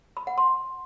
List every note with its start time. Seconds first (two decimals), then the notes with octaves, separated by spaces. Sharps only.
0.17 B5
0.27 F#5
0.38 C6